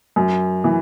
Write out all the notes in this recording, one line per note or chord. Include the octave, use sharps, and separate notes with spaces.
F#2
E3